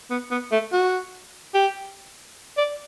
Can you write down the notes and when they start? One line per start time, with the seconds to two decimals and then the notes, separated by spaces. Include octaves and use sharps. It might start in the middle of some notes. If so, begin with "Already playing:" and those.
0.10 B3
0.31 B3
0.52 A3
0.73 F#4
1.54 G4
2.57 D5